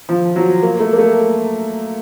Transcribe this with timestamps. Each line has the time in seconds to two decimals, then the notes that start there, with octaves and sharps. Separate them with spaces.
0.09 F3
0.36 F#3
0.62 A#3
0.79 A3
0.93 A#3
0.98 A3